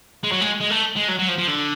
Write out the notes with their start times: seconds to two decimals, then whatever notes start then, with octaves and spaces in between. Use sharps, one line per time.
0.23 G#3
0.31 F#3
0.41 G#3
0.60 G#3
0.70 A3
0.96 G#3
1.08 F#3
1.19 F#3
1.28 F3
1.38 F3
1.48 D3